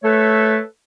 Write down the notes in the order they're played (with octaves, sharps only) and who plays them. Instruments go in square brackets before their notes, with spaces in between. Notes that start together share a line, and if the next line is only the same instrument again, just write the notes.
[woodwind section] A3 A4 B4 C#5